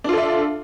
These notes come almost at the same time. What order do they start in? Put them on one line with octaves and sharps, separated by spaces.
D4 F4 A4 E5